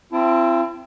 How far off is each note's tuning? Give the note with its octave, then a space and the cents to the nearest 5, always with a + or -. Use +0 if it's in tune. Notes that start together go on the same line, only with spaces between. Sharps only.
C4 -5 E4 +40 A5 -10